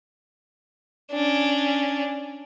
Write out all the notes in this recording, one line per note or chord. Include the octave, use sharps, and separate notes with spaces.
C#4 D4